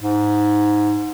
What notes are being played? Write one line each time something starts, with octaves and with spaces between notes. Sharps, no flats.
G#2